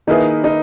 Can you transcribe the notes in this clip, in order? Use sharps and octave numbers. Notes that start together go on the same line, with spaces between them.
D#3 A#3 D#4 E4 G#4 B4
D#4